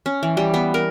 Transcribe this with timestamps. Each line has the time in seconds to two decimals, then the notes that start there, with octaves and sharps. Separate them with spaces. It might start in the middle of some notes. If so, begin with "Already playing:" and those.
0.06 C#4
0.23 E3
0.37 G3
0.54 B3
0.74 A#4